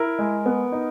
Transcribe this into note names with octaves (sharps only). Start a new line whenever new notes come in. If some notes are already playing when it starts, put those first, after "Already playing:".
Already playing: E4 A#4
G#3
B3
D#4